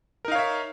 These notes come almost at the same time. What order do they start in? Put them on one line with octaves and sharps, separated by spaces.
A#4 D#4 F5 C#5 E5